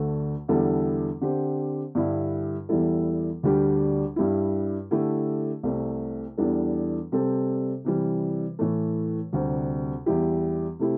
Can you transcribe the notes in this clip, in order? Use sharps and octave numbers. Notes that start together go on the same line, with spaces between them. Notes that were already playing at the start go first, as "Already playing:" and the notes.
Already playing: D2 D3 A3
E2 D3 G3 E4 A4
D3 C4 G4
G2 D3 G3 E4
E2 E3 G3 E4 A4
D2 D3 G3 D4 G4
G2 G3 E4
D3 A3 E4 G4
C2 C3 A3
E2 E3 G3 D4 A4
C3 G3 C4 A4
C3 E3 G3
A2 E3 A3
D2 C3 G3 C4
E2 E3 G3 E4 G4
C3 A3 E4 G4